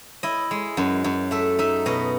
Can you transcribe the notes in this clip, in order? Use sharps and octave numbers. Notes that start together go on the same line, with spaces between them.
E4 D#5
G#3
F#2
F#2
A3 E5
D#4 E5
B2 D#5